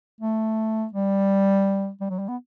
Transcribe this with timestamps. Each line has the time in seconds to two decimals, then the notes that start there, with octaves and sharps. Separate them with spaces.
0.21 A3
0.93 G3
2.01 G3
2.10 F#3
2.19 G3
2.28 B3